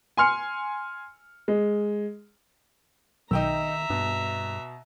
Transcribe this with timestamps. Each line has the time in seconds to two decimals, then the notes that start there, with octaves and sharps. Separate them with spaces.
0.17 G#5 C6 F6 C#7
1.48 G#3
3.31 B1 D#3 D#4 E5 G5 A#5 E6
3.90 G2 B2